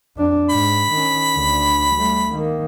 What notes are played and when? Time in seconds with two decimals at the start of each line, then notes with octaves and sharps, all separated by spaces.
0.16 F2 D4
0.50 G#2 B5
0.92 D#3 C#4
1.34 D2 D3
1.94 G3 A3
2.32 D#3 A#3